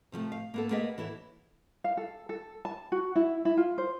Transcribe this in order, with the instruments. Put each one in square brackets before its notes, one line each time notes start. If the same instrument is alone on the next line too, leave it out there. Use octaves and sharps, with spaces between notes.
[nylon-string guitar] C3 F3 F#3 A3
F5
A#3 B3 A4
A#3 B3 G#4 B4 D5 D#5
E3 E4 A4 C#5
[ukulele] F5
A4
A4
A5
F#4
E4
E4
F4
C5